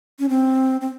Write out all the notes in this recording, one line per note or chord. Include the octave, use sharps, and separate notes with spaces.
C#4
C4
C4